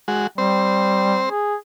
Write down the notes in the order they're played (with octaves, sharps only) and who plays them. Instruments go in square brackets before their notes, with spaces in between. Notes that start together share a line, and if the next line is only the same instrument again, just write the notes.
[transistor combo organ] G#3 F#4
[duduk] G3 [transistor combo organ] C4 C5
[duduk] G#4